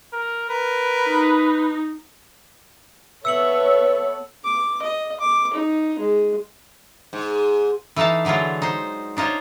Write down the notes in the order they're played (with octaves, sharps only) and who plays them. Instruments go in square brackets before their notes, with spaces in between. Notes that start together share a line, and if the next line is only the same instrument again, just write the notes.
[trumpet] A#4
[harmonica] A#4 [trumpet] B4
[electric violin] D#4
[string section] B3 A4 C#5 [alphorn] B4 [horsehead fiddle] E5 [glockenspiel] E6 C#7 F#7
[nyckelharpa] D6
D#5
D6
D#4
G#3
[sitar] G#2
[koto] E3 A3 D#4 F5 A5
D3 E3 F#3 G#3 F4
D#4 C5
D4 D#4 F4 C5 C#5